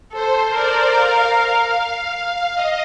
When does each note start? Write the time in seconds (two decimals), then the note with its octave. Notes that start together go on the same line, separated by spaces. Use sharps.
0.13 A4 C5
0.53 A#4 D5
0.94 F5
1.74 F5
2.55 D#5